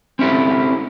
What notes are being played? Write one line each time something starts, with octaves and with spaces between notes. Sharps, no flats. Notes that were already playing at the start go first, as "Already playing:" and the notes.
C4 C#4 E4 G4 A4